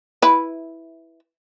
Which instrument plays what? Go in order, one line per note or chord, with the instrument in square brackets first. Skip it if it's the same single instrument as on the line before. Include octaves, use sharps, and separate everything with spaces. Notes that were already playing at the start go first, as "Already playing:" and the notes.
[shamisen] E4 B4